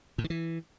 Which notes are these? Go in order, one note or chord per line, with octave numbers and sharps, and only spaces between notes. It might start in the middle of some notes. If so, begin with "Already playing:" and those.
A2
D#3
E3